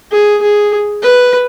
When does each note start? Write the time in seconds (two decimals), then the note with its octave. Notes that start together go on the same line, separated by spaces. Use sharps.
0.12 G#4
0.42 G#4
1.03 B4